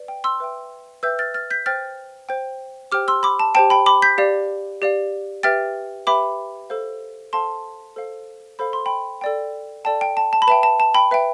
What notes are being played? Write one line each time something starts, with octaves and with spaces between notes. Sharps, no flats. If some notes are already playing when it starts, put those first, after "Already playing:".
Already playing: B4 D5
G5
C6 E6
B4 E5 G5
B4 E5 G5 E6 G6
F6 A6
F6 A6
G6 B6
C5 G5 F6 A6
C5 G5
G4 C5 G5 D6 F6
C6 E6
B5 D6
A5
G4 C5 G5 A5
G5 B5
B5 D6
G6 B6
G4 D5 F5
G4 D5 F5
G4 B4 E5 G5 F6 A6
G4 B4 E5 G5 B5 D6
A4 C5 F5
A4 C5 F5 A5 C6
A4 C5 F5
A4 C5 F5 B5
C6
G5 B5
A4 D5 G5
A4 D5 G5 A5
G5
A5
A5
B5
B4 E5 G5 A5
A5
A5
G5 B5
B4 E5 G5